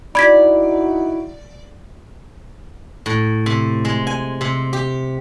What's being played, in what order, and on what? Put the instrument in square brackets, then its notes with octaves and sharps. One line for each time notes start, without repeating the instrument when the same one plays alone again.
[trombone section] D#4 E4 F#4 [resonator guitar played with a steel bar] D5 [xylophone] B5 G#6 B6
[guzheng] A2
C3
G#3
G#5
C3
G4